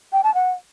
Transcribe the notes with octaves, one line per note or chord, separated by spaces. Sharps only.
G5
A5
F#5